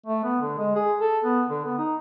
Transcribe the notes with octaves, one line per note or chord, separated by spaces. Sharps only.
A3
B3
D3
G#3
G#4
A4
B3
D3
B3
D#4